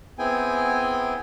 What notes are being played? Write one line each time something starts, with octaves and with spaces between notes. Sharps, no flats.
B3 C4 E4 G#4 G5 G#5